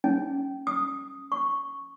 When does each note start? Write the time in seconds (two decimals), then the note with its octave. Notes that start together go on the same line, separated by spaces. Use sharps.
0.04 C#4
0.67 D#6
1.32 C#6